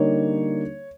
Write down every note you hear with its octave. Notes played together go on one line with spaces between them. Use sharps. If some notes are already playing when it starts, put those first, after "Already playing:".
Already playing: D3 G3 A#3 D#4 C#5